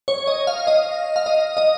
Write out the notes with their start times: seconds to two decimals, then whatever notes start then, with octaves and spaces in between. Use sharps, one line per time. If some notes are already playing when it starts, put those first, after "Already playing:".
0.08 C#5
0.27 D#5
0.47 F5
0.67 D#5
1.16 F5
1.26 D#5
1.57 D#5